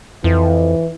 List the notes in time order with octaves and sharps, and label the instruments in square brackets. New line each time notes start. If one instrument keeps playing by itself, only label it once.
[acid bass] F2 [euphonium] E3